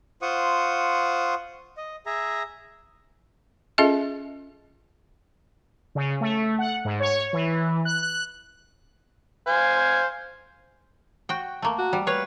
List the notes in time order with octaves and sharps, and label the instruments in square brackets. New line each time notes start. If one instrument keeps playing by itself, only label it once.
[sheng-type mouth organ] F4 C5 F#5 C#6 D#6
D#5
G#4 E5 A#5
[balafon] C#4 F4 G#4 A4 D#5 E5
[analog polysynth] C#3
A3
F#5
G#2
C#5
E3
F#6
F#6
[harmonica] C5 F5 G#5
[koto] F#4 G5
A3 A#3
[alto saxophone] F#4
[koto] G3
[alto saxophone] B4 [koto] C#5 F5